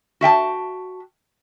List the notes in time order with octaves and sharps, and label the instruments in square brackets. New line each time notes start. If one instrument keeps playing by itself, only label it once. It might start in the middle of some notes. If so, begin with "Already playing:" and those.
[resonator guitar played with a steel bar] F#4 E5 G5 A5